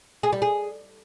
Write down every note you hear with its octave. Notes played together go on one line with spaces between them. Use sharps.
G#4
G3
G#4